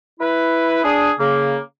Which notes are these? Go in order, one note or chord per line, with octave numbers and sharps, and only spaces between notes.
E4 B4
D4 G#4
C#3 A#3